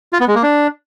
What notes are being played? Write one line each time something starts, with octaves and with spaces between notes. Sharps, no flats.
F4
B3
G#3
A#3
D4